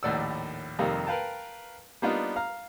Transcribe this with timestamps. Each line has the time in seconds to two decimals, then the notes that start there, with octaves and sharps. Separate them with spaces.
0.03 A#1 D#2 A2 D5 F#5 E6
0.79 F2 C3 D#3 G3 A#3 F5
1.07 A#4 B4 F5 G5 A5
2.02 G3 A#3 B3 D4 D#4 F4
2.36 F5 A#5 F6